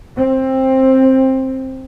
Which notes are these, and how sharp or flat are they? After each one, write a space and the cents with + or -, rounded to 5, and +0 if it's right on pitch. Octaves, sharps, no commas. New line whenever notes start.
C4 +15